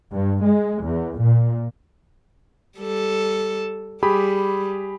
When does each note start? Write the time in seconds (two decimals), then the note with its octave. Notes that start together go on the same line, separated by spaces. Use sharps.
0.12 G2
0.44 G#3
0.82 E2
1.19 A#2
2.78 G3 A4
4.03 G3 G4 G#4 B5